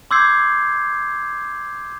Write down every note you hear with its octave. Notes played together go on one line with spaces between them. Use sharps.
C6 D6 E6 G6 G#6 C7